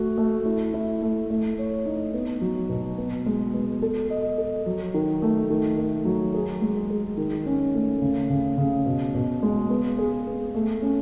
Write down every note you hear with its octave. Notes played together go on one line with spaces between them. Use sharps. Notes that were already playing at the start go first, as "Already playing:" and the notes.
Already playing: A3 F#4
A3
E4
E4
A3
A3
C#5
D#4
B3
F#3
B2
B3
G#3
B3
A4
D#5
A4
F#3
D#3
A3
D#3
A3
F#3
G#4
G#3
G#4
D#3
C#4
A3
C#3
C#3
C#3
B2
B2
G#3
B3
G#4
B3
A3
C#4